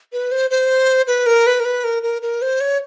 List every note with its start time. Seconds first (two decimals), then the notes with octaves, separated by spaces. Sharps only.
0.13 B4
0.32 C5
0.51 C5
1.07 B4
1.26 A#4
1.47 B4
1.60 A#4
1.65 B4
1.84 A#4
2.03 A#4
2.22 A#4
2.42 C5
2.61 C#5